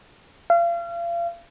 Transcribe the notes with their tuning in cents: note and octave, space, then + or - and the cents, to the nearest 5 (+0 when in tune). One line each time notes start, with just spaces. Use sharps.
F5 -35